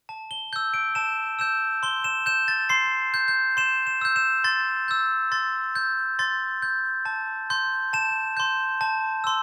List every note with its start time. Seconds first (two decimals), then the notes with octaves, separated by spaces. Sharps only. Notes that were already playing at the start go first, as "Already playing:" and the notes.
0.09 A5
0.31 G7
0.53 E6 G6
0.74 D7
0.95 A5 E7
1.39 E6 G6 E7
1.83 C6 G7
2.04 E7
2.26 G6 E7
2.48 A6
2.69 C6 C7
3.14 G6
3.28 G6
3.57 C6 E7
3.87 E7
4.01 E6 G6
4.16 E7
4.44 C6 A6
4.88 E6 G6
5.32 C6 A6
5.75 G6
6.19 C6 A6
6.62 G6
7.05 A5
7.50 C6 G6
7.93 A5 E7
8.37 C6 G6
8.81 A5
9.24 C6 E6